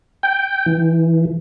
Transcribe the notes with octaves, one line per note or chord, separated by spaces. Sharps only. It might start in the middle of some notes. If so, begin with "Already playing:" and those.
G5
E3